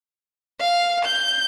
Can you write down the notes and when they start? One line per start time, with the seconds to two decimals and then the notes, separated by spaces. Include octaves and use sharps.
0.60 F5
1.05 G6